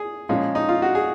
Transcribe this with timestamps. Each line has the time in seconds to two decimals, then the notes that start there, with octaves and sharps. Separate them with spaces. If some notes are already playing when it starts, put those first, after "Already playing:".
Already playing: G#4
0.29 A#2 F3 G#3 C#4
0.55 D#4
0.69 F4
0.82 F#4
0.95 G#4